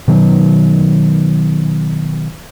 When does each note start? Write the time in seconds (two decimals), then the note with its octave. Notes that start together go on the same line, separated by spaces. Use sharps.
0.08 B2 D#3 F#3